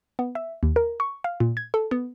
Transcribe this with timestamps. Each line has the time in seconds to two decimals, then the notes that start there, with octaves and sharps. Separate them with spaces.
0.19 B3
0.35 E5
0.63 D#2
0.76 A#4
1.00 C#6
1.24 F5
1.40 A#2
1.57 G#6
1.74 A4
1.91 B3